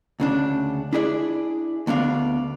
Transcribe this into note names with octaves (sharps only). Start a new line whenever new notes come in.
D2 C#3 D4
D4 E4 G#4 D5
D2 B3 D4 F5